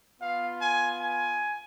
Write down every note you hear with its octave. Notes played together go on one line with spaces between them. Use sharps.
B3 F4 F5
G#5
G#5